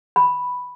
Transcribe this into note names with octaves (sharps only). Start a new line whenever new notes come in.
B5